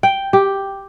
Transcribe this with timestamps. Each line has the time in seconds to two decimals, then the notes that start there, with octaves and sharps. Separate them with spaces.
0.03 G5
0.33 G4